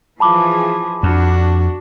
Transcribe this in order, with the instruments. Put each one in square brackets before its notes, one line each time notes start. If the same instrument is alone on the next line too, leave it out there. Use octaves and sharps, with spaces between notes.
[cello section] E3 F3 G#4 [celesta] A5 B5 D6
[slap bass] F2 [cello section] D4 F#4